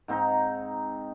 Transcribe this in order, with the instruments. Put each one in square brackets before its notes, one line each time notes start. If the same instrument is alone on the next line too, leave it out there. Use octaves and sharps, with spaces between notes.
[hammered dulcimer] G#2 C4 D#4 A#5